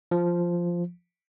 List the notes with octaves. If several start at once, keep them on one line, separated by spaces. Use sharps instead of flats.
F3